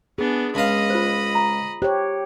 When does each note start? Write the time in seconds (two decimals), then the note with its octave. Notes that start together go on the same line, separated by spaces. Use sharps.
0.18 B3 D4 G#4
0.55 C#2 D#5 F5 B5
0.90 F4 C5
1.35 A#5
1.82 G4 C5 C#5